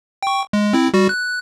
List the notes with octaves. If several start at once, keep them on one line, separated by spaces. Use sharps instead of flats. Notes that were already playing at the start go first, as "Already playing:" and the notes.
G5 C#6
G#3
C4 E4
G3 F#4
F#6